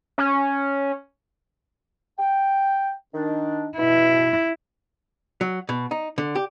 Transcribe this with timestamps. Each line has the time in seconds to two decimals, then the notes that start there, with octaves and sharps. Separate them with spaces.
0.18 C#4
2.19 G5
3.14 D#3 D4
3.78 B2 E4
5.41 F#3
5.69 B2
5.91 D#4
6.18 D3
6.35 G4